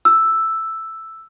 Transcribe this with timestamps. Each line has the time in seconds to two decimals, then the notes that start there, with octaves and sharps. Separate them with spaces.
0.05 E6